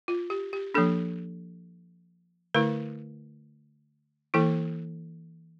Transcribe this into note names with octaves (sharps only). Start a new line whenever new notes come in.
F4
G4
G4
F3 A#3 D4 A4
D3 A3 E4 A#4
E3 A#3 E4 A4